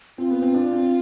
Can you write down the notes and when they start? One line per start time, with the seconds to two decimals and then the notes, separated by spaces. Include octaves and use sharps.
0.18 C4 F4
0.31 B3
0.42 C4
0.54 D4
0.73 C4